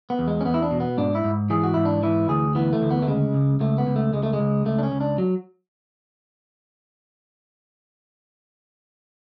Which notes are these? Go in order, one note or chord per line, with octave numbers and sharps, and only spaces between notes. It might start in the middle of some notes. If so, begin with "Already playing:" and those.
B3
E2
G#3
C#4
E2 B3
E4
D4
B2
B3
G#2 D4
E4
G#2
E3 G#4
F#4
G#2 E4
D4
E3 E4
D2 G#4
E3 B3
A3
D2
B3
A3
C#3 G#3
C#2
C#2 A3
B3
C#2
A3
C#2 G#3
A3
G#3
C#2
C#2 A3
D4
C#4
C#2
D4
F#3